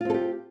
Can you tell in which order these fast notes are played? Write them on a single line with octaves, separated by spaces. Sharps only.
F4 C4 A4 G4